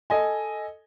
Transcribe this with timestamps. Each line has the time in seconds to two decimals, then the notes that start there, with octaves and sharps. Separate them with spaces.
0.10 A4 D#5 G#5